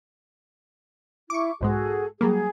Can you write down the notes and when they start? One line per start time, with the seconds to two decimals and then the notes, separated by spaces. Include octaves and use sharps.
1.30 E4 C#6 D6
1.61 B1 G#2 G#3 F#4 G#4 A4
2.21 F#3 G3 A#3 G#4